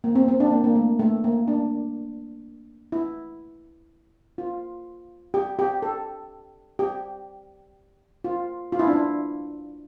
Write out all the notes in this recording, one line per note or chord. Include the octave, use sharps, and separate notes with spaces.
A#3
C4
C4
D4
A#3
A#3
A3
A3
A#3
D4
E4
F4
G4
G4
A4
G4
F4
F4
E4
D4
E4